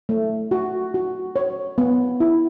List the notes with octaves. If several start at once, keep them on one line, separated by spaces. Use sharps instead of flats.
A3
F#4
F#4
C#5
B3
E4